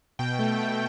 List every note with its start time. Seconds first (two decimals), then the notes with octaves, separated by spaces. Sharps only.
0.19 B2 G5
0.39 A3
0.60 A3